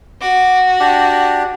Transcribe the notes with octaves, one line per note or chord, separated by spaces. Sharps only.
F#4 D6
D4 G4